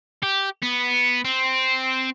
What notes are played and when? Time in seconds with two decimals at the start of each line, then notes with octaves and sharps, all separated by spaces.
0.23 G4
0.62 B3
1.25 C4